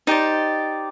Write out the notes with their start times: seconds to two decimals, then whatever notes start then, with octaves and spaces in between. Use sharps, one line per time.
0.07 D#4 G4 C5 D5